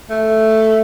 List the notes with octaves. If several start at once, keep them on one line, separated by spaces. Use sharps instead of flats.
A3